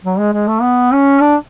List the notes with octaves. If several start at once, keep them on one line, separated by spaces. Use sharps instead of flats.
F#3
G#3
G#3
A3
B3
C#4
D4